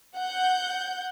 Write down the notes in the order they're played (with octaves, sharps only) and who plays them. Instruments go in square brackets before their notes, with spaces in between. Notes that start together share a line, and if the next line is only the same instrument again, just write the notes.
[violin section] F#5 G6